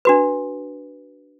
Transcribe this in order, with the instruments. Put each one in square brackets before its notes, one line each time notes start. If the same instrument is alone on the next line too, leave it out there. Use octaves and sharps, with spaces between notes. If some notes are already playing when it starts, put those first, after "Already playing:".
[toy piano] D4 F#4 B4